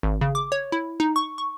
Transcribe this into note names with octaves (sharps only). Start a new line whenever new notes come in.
G#1
C#3
D6
C#5
E4
D#4
C#6
C#6